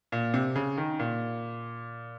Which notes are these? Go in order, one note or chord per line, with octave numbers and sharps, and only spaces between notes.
A#2
C3
C#3
D#3
A#2